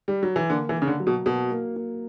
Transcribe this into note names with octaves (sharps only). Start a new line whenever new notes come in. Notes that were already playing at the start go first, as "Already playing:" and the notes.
G3
F#3
E3
D3 A#3
E3
A#3
C#3
D3
F#3
B2
B2 A#3
A#3
A#3